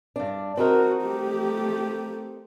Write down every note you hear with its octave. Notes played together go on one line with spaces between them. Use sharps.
G2 D4
C4 D#4 F#4 A#4
A3 G4